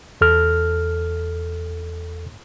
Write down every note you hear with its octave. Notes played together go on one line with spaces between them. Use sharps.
E2 A4 F6